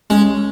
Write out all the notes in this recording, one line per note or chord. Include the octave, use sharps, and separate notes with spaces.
G#3 C#4